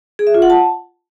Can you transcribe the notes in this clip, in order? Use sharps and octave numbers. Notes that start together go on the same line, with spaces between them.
G#4
E5
F4
F#5
A5